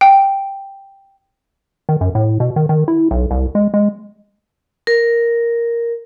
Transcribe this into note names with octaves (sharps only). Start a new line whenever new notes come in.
G5
D#3
F#2
A2
B2
D#3
D#3
E4
B1
C2
G#3
G#3
A#4